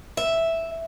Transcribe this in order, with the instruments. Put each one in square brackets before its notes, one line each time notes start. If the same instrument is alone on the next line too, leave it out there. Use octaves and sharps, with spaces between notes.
[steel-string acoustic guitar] E5